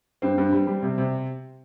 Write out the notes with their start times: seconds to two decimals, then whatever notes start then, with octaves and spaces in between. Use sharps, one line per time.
0.22 G2 C4
0.38 G2
0.53 G3
0.67 G3
0.82 C3
0.98 C3